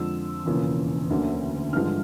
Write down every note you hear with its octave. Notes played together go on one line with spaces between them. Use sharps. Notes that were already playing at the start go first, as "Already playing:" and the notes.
Already playing: F2 D3 F3 G#3 E6
E1 E2 C#3 F3 A#3
D2 D3 F#3 A#3 C#4
A1 G2 D3 F3 G#3 F6